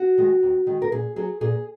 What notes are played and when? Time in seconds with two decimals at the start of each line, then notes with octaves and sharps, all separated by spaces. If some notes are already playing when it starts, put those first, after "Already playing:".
Already playing: F#4
0.18 D#3 G#3
0.43 D#2
0.67 D#3 G#3
0.82 A#4
0.92 A#2 G#4
1.16 F#3 G#4
1.41 A#2 G#4